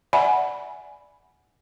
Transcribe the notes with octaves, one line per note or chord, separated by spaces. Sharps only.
D5 E5 F#5 G#5 B5